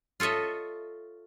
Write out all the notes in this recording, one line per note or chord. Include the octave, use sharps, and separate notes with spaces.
F4 A4 C#5 D#5 E5